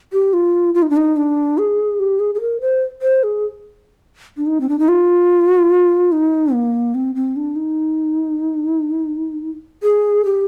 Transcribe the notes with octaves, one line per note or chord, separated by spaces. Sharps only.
G4
F4
F4
D#4
D4
D#4
D4
G#4
G4
G#4
G#4
A#4
C5
C5
G#4
D4
D#4
C4
D4
D#4
F4
D#4
A#3
C4
C4
D4
D#4
G#4
G4